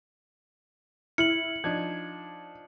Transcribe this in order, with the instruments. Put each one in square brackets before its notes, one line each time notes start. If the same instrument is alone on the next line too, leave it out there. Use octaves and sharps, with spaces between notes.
[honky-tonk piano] E4 [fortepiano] F6 [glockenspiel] C#7 F#7
[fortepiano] F3 D4 D#4 [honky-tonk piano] G#6